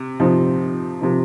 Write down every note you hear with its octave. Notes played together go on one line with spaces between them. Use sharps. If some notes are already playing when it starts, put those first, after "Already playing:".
Already playing: C3
C3 F3 C4 D#4
C3 F3 C4 D#4